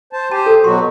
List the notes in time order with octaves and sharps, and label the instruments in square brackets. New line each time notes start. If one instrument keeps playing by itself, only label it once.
[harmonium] C5 A5
[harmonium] G4 C5 [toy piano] A5
[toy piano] A4
[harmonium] B2 F#3 F#4 [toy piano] C6